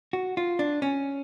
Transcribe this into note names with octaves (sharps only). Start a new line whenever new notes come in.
F#4
F4
D4
C#4